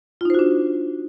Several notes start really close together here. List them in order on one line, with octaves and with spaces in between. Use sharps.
F4 D#4 C5 F#4 D4